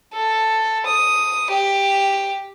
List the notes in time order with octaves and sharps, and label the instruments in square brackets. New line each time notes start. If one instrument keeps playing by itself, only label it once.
[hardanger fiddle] A4
D#6
G4